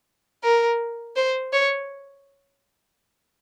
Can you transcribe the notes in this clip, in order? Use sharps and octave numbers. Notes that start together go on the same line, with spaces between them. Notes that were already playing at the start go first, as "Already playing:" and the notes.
A#4
C5
C#5